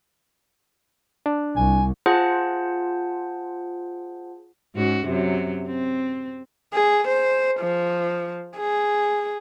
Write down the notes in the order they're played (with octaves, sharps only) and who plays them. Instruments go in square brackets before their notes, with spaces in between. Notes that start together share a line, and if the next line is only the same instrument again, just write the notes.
[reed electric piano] D4
[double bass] C2 [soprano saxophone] G#5
[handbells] F4 G#4 C5 F#5 A5
[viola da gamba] G#2 C#4 F#4
F#2 C3 F#3
C4
[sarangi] G#4
C5
F3
G#4